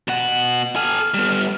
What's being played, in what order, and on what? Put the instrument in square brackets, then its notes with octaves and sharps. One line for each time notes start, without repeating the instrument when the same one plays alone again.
[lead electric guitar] B2 F#5
[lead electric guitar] A4 G#5 [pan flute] F6
[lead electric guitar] G3 B3